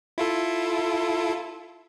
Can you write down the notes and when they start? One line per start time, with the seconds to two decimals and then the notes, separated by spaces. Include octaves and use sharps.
0.18 E4 F4 A4